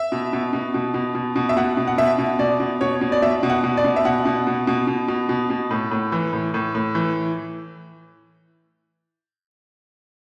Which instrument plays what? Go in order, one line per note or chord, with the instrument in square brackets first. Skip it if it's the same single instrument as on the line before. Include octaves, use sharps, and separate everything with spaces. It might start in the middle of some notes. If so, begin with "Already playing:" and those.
Already playing: [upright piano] E5
B2
B2
B2
B2
B2
B2
B2
E5
B2 F#5
B2
F#5
B2 E5
B2
B2 D5
B2
B2 C#5
B2
D5
B2 E5
B2
F#5
B2
D5
B2
E5
B2 F#5
B2
B2
B2
B2
B2
B2
B2
A2
A2
E3
A2
A2
A2
E3